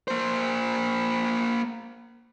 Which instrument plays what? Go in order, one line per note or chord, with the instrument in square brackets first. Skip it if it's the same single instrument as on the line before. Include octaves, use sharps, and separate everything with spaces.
[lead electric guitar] A#3 C5